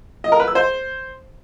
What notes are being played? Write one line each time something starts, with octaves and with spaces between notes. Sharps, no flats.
D#5
A#4
B4
E6
C5